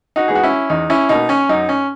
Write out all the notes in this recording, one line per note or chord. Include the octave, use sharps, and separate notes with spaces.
D#4 F#4
E3 G#3 B3 G#4
F#4
C#4 E4
E2 D#4
C#4 E4
B2 A#3 D#4
C#4
F#2 D#4
C#4